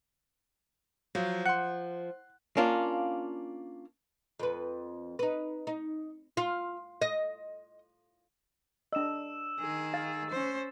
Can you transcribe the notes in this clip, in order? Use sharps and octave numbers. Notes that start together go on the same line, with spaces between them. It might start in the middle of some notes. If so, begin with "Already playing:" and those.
F3 F#3
F#5 C6 F#6
A#3 C#4 D4 F4
F2 B4
D#4 B4
D#4
F4
D#5
D4 D#5 E6 E7
D#3 G#4
F5 A6
C#4 C5